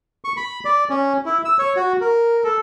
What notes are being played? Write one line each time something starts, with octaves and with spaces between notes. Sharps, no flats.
C#6
B5
D5
C#4
E4
E6
C#5
F#4
A#4
A4